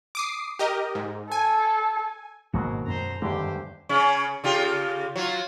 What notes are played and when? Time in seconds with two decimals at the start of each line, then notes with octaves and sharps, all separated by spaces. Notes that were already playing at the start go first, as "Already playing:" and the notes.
0.15 D6 D#6 C7
0.59 G4 A#4 D#5
0.95 G#2
1.32 A4 G#5
2.54 A1 G#2 B2 D#3 F#3 G#3 A#3 F#4
2.87 F#2 C5 A#5
3.22 E2 G2 D3 D#3 G#3 G4 C5
3.89 C#3 C#4
4.44 C#3 F4 G4
5.16 F#3 F4